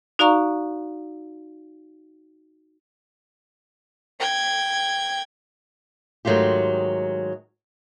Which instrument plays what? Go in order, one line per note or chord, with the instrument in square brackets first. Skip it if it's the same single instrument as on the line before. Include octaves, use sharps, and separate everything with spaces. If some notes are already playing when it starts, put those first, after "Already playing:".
[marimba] D#4 F#4 D5 F5 A#5 C#6
[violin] G5 G#6
[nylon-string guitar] G#2 D#3 F#3 A3 F4 G4